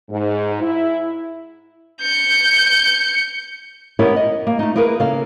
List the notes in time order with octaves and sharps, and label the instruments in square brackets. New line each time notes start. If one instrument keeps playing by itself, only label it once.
[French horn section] G#2
E4
[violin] G6 C#7
[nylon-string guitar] B3 C#4 E4 G4 A#4 C#5
D#5
A#3
A3 D#4
A#3 E4 G#4 A#4 B4
C#3 A#3 A4 F5